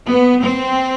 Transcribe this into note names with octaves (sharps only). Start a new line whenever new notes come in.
B3
C4